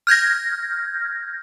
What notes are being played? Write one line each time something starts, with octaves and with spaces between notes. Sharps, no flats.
F6 G6 G#6 A#6